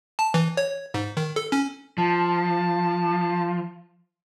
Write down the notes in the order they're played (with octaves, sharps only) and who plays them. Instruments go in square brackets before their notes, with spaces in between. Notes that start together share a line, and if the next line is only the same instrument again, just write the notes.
[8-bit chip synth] A5
E3
C#5
G#2
D#3
A4
C#4
[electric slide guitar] F3 [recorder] A5